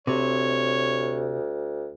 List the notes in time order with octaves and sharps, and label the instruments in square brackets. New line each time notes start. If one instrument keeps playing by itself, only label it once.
[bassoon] D2 [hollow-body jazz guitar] C3 [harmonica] C#5